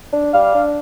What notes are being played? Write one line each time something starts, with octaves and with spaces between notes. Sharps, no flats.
D4
G3 D5 F5
D4